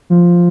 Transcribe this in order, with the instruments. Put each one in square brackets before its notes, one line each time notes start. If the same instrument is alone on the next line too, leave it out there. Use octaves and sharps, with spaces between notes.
[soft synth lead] F3